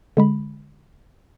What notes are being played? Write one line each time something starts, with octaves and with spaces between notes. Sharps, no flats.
D3 G#3 B5